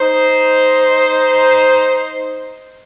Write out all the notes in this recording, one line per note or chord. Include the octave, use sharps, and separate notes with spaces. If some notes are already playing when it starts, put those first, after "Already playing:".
D#4 C5